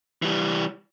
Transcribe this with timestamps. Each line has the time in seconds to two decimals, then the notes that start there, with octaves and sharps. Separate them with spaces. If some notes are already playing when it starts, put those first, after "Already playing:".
0.22 E3 G3